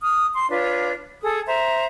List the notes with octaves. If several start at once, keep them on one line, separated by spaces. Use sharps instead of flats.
D#6 F6
C6
D4 F4 B4 C#5
G#4 A4 D#6
C5 E5 A#5